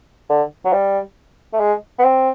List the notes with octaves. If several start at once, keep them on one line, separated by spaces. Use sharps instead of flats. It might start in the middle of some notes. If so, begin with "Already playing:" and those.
D3
F#3
G3
A3
G#3
B3
C4